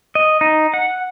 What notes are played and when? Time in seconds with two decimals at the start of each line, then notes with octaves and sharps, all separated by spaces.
0.15 D#5
0.41 D#4
0.74 F#5